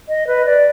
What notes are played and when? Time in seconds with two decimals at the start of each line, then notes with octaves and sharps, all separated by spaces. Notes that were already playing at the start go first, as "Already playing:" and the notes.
0.08 D#5
0.27 B4
0.45 D5